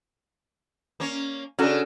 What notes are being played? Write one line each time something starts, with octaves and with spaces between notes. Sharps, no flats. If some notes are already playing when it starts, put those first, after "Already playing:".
A#3 C#4 C#5
C#3 C#4 D4 F#4 A4